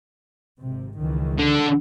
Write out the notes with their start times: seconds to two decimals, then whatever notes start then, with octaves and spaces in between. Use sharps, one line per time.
0.59 G#1 C3
0.97 C#2 D#3 E3
1.39 D3